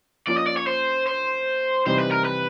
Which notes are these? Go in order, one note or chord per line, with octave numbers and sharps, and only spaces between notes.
F3 A#3 C#4 F4 D5
D#5
D5
C#5
C5
C5
C3 E3 G3 C4 D#4 C5
B4
A#4
B4